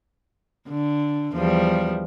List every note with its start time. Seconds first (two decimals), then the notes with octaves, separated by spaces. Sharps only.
0.69 D3
1.33 E2 F3 G3